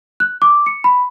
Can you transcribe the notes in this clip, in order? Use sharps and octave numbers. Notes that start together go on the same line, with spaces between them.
F#6
D6
C#7
B5